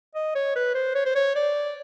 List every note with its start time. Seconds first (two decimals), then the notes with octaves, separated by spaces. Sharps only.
0.15 D#5
0.35 C#5
0.55 B4
0.74 C5
0.95 C#5
1.06 C5
1.15 C#5
1.35 D5